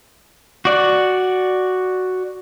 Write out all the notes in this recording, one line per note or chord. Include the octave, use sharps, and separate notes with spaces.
F#4 D5